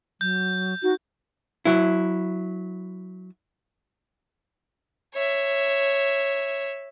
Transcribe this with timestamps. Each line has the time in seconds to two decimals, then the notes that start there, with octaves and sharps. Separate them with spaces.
0.21 F#3 G6
0.83 D#4 F#4
1.65 F#3 E4
5.14 C#5 E5